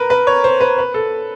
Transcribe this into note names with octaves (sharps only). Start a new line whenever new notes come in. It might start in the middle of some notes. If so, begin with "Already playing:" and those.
Already playing: A#4 B4
B4
C#5
C5
B4
B4
A4